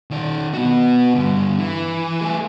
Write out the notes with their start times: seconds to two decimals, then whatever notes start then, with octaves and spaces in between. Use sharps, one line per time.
0.11 D#3 D5
0.54 B3 F#4
1.14 G2 D3
1.58 E3
2.21 A3 G#4